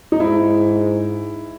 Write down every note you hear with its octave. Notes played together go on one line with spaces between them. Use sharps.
D#4
G#2 E4